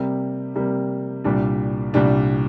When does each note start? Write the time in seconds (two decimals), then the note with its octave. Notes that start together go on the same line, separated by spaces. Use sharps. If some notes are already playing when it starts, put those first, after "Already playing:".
Already playing: C3 G3 A#3
0.55 C3 G3 A#3
1.24 C2 A#2 G3 D4
1.94 C2 A#2 G3 D4